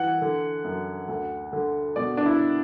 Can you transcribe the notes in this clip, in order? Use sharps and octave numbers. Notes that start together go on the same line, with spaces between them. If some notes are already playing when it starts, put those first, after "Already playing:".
Already playing: E3 F#5
D3
F#2
D2
D3
B2 D5
D4
E4